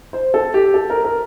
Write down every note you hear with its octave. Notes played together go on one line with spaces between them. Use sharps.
C5
A4
G4
A4
A#4
A#4